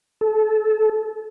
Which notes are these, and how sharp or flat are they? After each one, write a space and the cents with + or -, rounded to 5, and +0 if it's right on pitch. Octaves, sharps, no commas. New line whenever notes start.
A4 -25